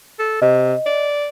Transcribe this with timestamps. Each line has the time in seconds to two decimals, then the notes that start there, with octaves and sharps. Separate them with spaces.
0.19 A4
0.42 C3 D#5
0.86 D5